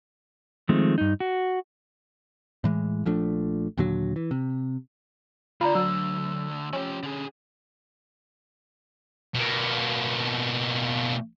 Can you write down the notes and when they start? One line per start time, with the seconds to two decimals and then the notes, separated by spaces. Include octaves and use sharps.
0.69 D#3 F3 G#3 A3 C4
0.98 G2 D#4
1.20 F#4
2.64 A2 E3 G#3
3.06 A#1 F3 A3 D4
3.77 D#2 A#2 D3 F#3
4.16 E3
4.31 C3
5.61 D2 D3 F4 D5 A#5 B5
5.75 F#3 E6
6.73 F3 C#4 G4
7.03 D3 G#4
9.35 B2 A#3